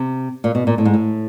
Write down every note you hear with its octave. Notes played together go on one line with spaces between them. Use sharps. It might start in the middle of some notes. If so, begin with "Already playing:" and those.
Already playing: C3
A#2
B2
A#2
A2
G#2
A2